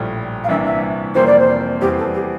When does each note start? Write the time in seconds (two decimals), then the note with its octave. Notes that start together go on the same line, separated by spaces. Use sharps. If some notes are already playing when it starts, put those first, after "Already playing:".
Already playing: A#1 A2 G3
0.44 F5
0.48 C2 C3 E3 A#3 D4 E5
0.65 E5
1.14 F2 C3 E3 G3 A#3 C5
1.27 D5
1.39 C5
1.81 E2 E3 G3 C4 G4
1.98 A4
2.14 G4